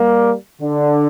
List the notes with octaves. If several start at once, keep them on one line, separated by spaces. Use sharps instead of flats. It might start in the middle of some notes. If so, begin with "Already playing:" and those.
Already playing: G3 A#3
D3